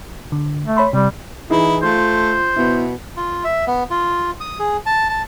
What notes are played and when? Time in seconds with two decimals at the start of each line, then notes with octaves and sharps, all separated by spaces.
0.32 D3
0.65 A3
0.77 C#5 B5 C6
0.93 C3 G3
1.50 E3 D#4 E4 G#4
1.83 A3 F4 C5
2.56 B2 B3 E4
3.17 F4
3.44 E5
3.67 B3
3.90 F4
4.40 D#6
4.59 G#4
4.86 A5
5.09 A5